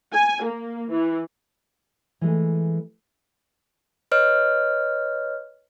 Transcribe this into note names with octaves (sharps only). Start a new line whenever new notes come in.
G#5
A#3
E3
E3 G#3 A3
B4 C#5 D#5 F6